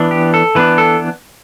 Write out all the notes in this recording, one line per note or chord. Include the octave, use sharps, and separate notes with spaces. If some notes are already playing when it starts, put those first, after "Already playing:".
Already playing: E3 B3 D4
G4
A4
E3 B3 D4 B4
A4